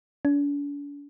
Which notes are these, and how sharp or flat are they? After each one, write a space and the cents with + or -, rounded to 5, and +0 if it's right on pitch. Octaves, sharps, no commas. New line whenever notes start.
D4 -45